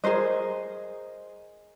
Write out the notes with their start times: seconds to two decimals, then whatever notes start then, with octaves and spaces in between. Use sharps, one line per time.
0.04 G#4 A#4 C5 D#5